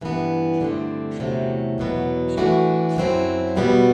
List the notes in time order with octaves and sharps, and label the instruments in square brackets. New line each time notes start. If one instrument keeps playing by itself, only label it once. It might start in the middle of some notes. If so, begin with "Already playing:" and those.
[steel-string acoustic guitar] G2 E3 G3 B3
G2 D3 A3 C4
E2 C3 F#3 A3
E2 B2 F#3 B3
A2 E3 A3 D4 F#4
F#2 F#3 C4 E4
E2 B2 G3 B3 F#4